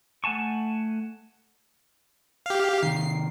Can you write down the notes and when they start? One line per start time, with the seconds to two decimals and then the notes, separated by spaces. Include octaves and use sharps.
0.24 A3 F#5 G#5 A5 C#6
2.46 G4 F5
2.83 C3 D#3 C7